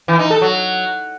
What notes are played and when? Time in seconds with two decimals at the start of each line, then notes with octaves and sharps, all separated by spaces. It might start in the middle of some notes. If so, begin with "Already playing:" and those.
0.08 E3
0.19 D#4
0.30 A4
0.42 F#3